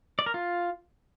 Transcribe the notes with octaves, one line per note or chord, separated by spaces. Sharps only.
D5
A#4
F4